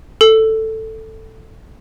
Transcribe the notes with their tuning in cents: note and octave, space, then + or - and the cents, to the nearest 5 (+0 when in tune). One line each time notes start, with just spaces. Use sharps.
A4 +5